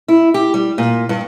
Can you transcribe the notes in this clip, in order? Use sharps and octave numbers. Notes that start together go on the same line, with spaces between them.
E4
G4
G3
A#2
G2